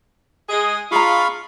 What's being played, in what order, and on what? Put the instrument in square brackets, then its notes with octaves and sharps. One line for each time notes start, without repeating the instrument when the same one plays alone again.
[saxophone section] G#3 G#4
[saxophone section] D4 D#4 F4 [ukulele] G#4 A#5 [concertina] F5 B5 C#6